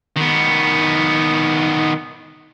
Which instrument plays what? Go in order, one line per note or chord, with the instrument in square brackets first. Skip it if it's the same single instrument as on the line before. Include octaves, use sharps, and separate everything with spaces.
[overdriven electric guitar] D#3 B3